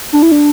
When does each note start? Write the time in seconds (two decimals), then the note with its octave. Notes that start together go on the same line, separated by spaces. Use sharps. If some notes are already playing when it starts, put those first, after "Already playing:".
0.13 D4
0.22 E4
0.32 D4